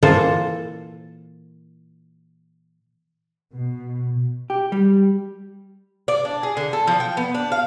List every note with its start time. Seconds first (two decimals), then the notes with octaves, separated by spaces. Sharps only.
0.03 A#2 E3 A#3 F4 A4 C5
3.53 B2
4.50 G4
4.72 G3
6.08 D5
6.25 D4
6.43 G#4
6.57 D3
6.73 A4
6.87 F3
7.00 G5
7.17 B3
7.35 D4
7.52 F5